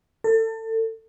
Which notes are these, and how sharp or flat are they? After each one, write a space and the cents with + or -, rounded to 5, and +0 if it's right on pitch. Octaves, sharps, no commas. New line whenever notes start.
A4 +30